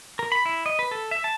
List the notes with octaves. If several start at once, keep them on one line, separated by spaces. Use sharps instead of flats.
A#4
B5
E4
D#5
B4
A4
E5
A5